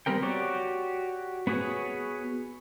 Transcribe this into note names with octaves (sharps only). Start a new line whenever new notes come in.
G3 B3 C4 A#4 G5
F#4 G4 C#5 D5
B3 F#4 G#4 B4 C#5